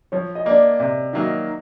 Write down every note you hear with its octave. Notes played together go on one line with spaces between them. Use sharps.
F3 C#5
D#5
A#3 D4 D5
C3 E5
D#3 F#3 A#3 D#4 E5